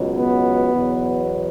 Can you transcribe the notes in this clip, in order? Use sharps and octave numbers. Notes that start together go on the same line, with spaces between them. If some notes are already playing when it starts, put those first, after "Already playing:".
Already playing: C#2 B2 F#3
B3
E2 B2 F#3